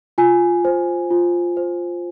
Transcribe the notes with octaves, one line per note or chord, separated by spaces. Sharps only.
F4 G#5
C5
F4
C5